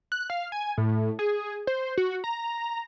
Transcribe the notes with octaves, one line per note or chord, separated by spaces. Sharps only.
F#6
F5
G#5
A2
G#4
C5
F#4
A#5